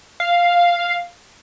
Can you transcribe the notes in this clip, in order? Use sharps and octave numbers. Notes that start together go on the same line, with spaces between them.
F5